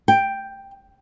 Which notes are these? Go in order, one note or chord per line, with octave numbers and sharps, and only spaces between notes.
G5